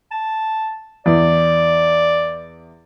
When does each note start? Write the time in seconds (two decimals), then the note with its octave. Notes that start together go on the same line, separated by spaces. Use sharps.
0.11 A5
1.06 E2 D5